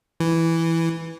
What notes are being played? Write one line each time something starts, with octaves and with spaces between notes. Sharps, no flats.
E3